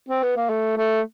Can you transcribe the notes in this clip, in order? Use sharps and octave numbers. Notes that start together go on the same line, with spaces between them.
C4
B3
A#3
A3
A3